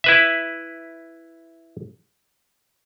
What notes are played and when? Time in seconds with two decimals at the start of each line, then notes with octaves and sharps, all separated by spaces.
0.04 E4 B4 E5